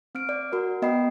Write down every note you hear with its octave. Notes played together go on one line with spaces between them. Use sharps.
C4 F6 D7
D5
F#4 A#4 D5
B3 D#5 G5 B5 C7